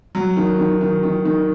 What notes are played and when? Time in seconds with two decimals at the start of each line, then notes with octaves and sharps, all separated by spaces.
0.15 F#3
0.37 D#3
0.59 D#3
0.81 D#3
1.03 D#3
1.25 D#3